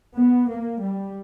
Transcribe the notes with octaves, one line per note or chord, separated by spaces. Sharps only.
B3
A#3
G3